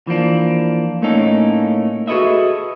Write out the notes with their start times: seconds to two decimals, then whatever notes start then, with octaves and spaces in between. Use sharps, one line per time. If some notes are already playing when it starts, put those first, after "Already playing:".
0.07 E3 F3 A#3 D4
1.02 A2 A3 A#3 C#4 D#4 A4
2.08 F#4 G#4 A4 B4 D#5 E5